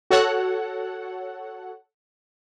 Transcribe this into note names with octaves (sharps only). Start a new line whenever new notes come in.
F#4 A4 C#5 F#5